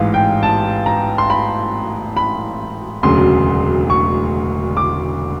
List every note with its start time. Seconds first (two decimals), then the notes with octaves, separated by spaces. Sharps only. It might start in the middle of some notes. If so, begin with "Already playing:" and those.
Already playing: A1 G#2 E3 F5
0.14 G5
0.43 A5
0.86 A#5
1.18 C6
1.30 B5
2.17 B5
3.03 E1 D2 C#3 F#3 C6
3.90 C#6
4.77 D6